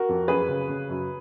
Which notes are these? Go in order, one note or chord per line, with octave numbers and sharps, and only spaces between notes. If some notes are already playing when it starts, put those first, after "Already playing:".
Already playing: F#4 A#4
F2
F#2 G#4 B4
C#3
C#3
F#2